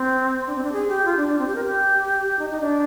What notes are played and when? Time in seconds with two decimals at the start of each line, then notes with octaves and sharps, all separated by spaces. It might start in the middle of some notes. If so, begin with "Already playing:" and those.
Already playing: C4
0.47 D4
0.55 C4
0.64 D4
0.72 G#4
0.88 G4
1.05 F4
1.17 D4
1.28 D4
1.39 C4
1.47 G4
1.55 A#4
1.64 G4
2.39 D#4
2.50 D#4
2.61 D4